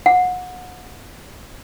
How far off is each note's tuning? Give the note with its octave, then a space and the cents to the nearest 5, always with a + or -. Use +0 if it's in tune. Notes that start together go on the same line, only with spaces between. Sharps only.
F#5 -25